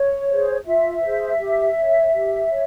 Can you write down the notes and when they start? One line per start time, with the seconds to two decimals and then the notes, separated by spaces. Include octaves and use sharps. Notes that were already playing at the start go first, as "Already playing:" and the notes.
Already playing: C#5
0.28 G#4 C5
0.65 F4 E5
1.02 G#4 C5
1.39 G4
1.76 C#5
2.13 G4
2.50 C#5